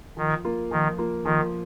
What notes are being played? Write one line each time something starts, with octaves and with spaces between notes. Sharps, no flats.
D#3 F3
A#3 F4
D#3 F3
A#3 F4
D#3 F3